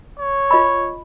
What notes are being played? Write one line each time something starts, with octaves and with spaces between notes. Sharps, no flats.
C#5
F4 D#5 B5